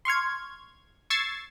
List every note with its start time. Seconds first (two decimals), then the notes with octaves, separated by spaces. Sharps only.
0.05 C6 C#6 F6 G#6
1.10 C#6 E6 G#6 A6 C7